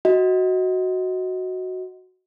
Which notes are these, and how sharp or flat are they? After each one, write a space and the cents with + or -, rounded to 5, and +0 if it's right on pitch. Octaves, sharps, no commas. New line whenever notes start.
F#4 +0 D#5 +20